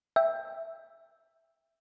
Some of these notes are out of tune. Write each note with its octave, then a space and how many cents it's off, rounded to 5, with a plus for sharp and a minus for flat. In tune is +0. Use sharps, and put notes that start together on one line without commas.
E5 +0 G5 +10